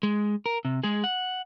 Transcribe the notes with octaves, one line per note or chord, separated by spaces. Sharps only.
G#3
A#4
C3
G#3 G#4
F#5